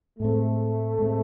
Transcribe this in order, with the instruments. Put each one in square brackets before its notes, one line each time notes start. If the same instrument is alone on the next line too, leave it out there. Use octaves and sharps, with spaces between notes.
[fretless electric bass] A2 G#3 C4 [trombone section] A3
[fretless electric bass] A2 G#3 C4